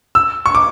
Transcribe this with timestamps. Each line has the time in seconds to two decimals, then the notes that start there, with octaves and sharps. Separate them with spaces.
0.15 E6
0.46 C#6
0.55 D6